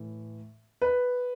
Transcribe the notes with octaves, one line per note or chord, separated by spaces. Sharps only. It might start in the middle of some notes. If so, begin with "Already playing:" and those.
Already playing: A2 E3
B4